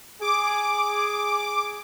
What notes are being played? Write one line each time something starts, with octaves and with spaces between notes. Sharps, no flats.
G#4 D6